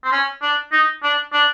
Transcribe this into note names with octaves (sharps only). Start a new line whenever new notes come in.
C4
C#4
D4
D#4
D4
D4